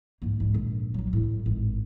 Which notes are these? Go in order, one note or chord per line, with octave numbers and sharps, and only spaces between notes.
G#2 A#3
G#2 F#3
A#1 G#2
F#3 D4
A2 C3
G#1